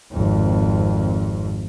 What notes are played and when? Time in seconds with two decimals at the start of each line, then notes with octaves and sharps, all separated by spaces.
0.11 G#1 F2